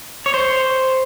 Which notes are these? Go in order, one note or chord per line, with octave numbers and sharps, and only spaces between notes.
C#5
C5